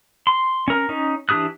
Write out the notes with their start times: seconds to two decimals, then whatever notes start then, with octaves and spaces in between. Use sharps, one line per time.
0.27 C6
0.68 C#4 A#4
0.89 C#4 D#4
1.29 E3 D4 G4 D#6 F#6